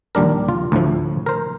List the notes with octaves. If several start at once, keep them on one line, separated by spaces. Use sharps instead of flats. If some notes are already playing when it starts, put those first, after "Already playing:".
A#1 D#2 G3 D4 A#4
F4
D2 A2 F3
A#4 C5